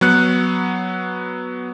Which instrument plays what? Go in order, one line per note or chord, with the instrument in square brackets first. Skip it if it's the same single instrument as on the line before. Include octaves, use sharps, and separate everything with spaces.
[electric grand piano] F#3 B3 F#6 C#7